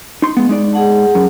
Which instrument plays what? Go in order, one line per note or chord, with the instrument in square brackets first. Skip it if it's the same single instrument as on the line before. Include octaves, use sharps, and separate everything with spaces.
[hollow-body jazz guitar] D#4 C6
G#3 B3
G#3 D#4 D5
[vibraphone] G#4 F#5 A5
[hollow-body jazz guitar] F#2